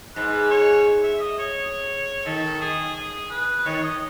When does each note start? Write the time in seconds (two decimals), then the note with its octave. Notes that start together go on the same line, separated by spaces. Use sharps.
0.15 G#2 B4
0.50 C#5
1.03 E5
1.20 D#5
1.39 C#5
2.26 D#3 A4
2.61 G#4
2.95 G#4
3.30 B4
3.66 D#3 C#5
3.83 D#5